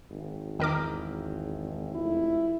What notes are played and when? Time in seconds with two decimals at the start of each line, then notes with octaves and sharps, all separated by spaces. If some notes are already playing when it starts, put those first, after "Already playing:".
0.10 G#1
0.59 E2 D#3 A#4 D6
1.95 F1 E4